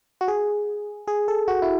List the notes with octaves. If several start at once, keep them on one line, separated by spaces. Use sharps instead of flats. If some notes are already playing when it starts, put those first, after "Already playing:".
F#4
G#4
G#4
A4
F#4
E4